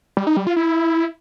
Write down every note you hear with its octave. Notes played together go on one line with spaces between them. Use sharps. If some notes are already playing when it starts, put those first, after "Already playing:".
G3
D#4
G3
F4
E4